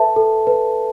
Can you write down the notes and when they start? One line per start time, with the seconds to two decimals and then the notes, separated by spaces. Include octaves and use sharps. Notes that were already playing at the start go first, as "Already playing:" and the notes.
Already playing: A4 B4 E5 A5
0.16 A4
0.47 B4